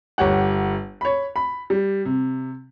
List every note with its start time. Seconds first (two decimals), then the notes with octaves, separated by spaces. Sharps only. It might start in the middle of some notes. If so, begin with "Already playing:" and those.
0.18 G1 G4 C#5 F#5
1.01 C#5 B5
1.36 B5
1.70 G3
2.05 C3